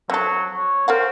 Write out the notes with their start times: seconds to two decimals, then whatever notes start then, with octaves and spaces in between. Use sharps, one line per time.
0.10 F#3 C4 A4
0.54 C#5
0.88 C4 A#4 F5 F#5